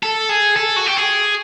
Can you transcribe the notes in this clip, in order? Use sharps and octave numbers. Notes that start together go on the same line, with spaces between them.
A4
G#4
A4
F#4
G4
G#4